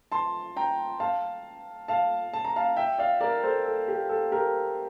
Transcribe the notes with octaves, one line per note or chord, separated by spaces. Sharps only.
A5 C6
G5 A#5
F5 A5
F5 A5
A5
A#5
F5 A5
E5 G5
D5 F5
A#4 D5
A4 C5
A4
G4
A4
G4 A#4